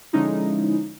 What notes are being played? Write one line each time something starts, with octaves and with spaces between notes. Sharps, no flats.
D3 F3 G#3 C#4 D#4 E4